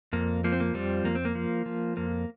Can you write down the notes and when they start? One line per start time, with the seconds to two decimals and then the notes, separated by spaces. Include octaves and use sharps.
0.13 F2 A#3
0.44 F3 A#3
0.52 C4
0.60 A#3
0.74 F2 G3 C4
1.05 F2 A#3
1.15 C4
1.25 A#3
1.35 F3
1.66 F3
1.97 F2 A#3